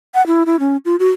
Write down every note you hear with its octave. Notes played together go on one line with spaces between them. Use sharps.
F#5
E4
E4
C#4
F4
F#4